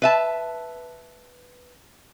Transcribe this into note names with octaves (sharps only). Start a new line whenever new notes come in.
B4 E5 A5